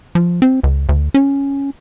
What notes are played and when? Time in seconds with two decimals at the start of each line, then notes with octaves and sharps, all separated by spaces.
0.15 F3
0.42 C4
0.63 C#2
0.89 D2
1.14 C#4